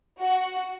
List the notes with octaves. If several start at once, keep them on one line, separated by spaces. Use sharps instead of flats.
F#4